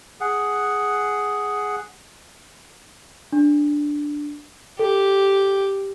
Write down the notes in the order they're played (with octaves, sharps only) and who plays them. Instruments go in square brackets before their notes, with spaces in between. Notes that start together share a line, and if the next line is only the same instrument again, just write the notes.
[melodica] G#4 F#5
[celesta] D4
[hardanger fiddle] G4 [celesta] A4